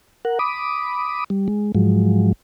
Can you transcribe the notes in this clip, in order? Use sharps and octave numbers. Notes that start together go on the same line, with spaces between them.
A#4 F#5
B5 D6 D#6
G3
G#3
G#2 F3 F#3 G#3